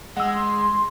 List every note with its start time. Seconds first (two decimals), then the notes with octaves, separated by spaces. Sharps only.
0.17 G#3 F#5 E6
0.35 C6